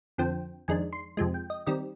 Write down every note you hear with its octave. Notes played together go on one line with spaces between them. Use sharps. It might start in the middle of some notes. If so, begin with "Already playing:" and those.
F2 D3 F3 C4 G5
F2 D#3 G#3 D4 G#5
C6
F2 C3 F3 G#3 G#5
G5
D#5
D#3 G3 C4 D#5